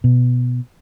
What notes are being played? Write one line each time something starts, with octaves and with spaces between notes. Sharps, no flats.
B2